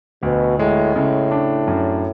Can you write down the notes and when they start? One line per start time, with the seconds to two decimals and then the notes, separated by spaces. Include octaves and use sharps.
0.23 D2 B2
0.59 A2 G#3
0.95 A2 C#3
1.31 D4
1.68 F#2